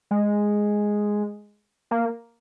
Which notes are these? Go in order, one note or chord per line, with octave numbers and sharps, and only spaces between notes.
G#3
A#3